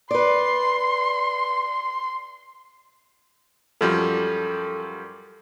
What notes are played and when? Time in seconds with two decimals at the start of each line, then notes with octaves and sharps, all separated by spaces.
0.11 B4 D5 C6
3.81 F#2 F3 G3 A4